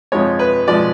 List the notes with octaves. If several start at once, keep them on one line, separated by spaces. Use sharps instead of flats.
F2 F3 G#3 C#5
B4
F3 G#3 D5